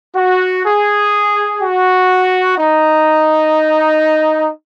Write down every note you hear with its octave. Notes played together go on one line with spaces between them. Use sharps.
F#4
G#4
F#4
D#4